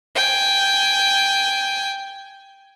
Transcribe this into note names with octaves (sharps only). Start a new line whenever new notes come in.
G5 G#5